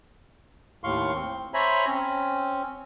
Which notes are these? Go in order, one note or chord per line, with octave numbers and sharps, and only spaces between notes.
D#2 A2 F5 C6 C#6
C4
C5 C#5 E5 G#5 A#5 B5
C4 C#4